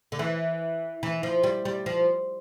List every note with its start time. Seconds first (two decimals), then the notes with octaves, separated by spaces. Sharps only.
0.12 D3
0.19 E3
1.03 E3
1.23 F3
1.43 G3
1.65 G3
1.86 F3